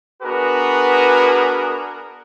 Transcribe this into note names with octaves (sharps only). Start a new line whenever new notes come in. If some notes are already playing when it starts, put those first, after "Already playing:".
B3 D4 F#4 G#4 A#4 B4